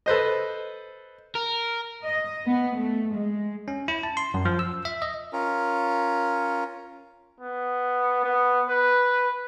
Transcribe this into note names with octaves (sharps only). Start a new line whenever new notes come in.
A4 B4 C5 D#5
A#4
D#5
B3
A3
G#3
C#4
E4
A5
C6
F#2
F3
E6
E5
D#5
C#4 F4 A#4
B3
B3
B4